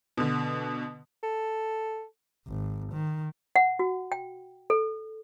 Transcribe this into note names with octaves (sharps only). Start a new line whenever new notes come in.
B2 D3
A4
G#1
D#3
F#5
F#4
G5
A4